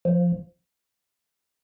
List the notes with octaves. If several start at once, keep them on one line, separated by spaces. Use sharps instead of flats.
F3